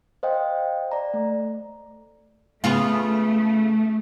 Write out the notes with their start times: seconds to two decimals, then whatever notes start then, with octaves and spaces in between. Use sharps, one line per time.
0.23 C5 D#5 F5 G5
0.92 D5 A#5
1.14 A3
2.64 C#3 A3 B3 F4